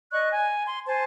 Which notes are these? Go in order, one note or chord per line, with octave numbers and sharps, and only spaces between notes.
D5 D#5 C#6 F#6
G#5
C6
C5 G#5 A5